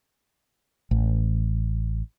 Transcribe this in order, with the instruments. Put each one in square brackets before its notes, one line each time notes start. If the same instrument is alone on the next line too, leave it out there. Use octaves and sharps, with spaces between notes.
[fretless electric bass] A1